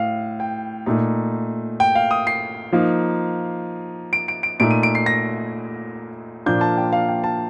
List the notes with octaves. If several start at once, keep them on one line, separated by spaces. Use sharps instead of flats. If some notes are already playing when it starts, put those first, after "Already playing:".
Already playing: A2 F5
G5
A#2 A3 D#4
G5
F5
D#6
C7
F3 A#3 D#4
D7
D7
D7
A#2 A3 D#4 D7
D#7
D7
C7
A#6
A#2 F3 A#3 D4 G6
A5
G5
F5
G5
A5